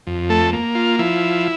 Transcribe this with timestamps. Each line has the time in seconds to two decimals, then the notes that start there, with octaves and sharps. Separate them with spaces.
0.07 F2
0.30 A3 A4
0.53 A#3
0.75 F4
0.99 F3 E4